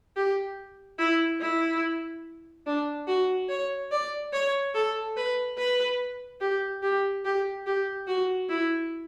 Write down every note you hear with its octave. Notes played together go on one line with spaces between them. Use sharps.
G4
E4
E4
D4
F#4
C#5
D5
C#5
A4
B4
B4
G4
G4
G4
G4
F#4
E4